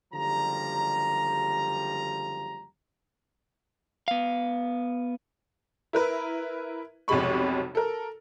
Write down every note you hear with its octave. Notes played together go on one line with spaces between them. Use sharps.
F#1 D3 F3 G3 G4 A#5
B3 F5
E4 A#4 B4
B1 F2 C3 G#3 B5 C#6
A4 A#4